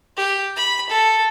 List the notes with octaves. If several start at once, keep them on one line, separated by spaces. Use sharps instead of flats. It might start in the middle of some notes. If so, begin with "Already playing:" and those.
G4
B5
A4